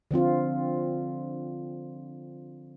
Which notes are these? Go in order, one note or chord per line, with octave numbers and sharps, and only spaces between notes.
D3 F3 C4 F4